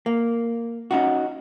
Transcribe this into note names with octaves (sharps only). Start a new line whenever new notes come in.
A#3
C#4 D#4 F#4